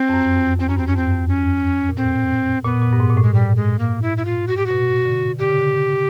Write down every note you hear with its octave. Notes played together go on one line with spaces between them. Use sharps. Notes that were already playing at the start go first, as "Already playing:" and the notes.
Already playing: C4
F2
F#2
F2
E2 C4
F#2 C#4
G2 C4
C#4
F2 C4
F2
C#4
A#2
A2 C4
A#2 B3
A#2
G2
G#2
A#2
A2
G#3
G3
G#3
A#3
E4
E4
F4
F#4
G4
B2 F#4
D3
D3 G4
C#3
D3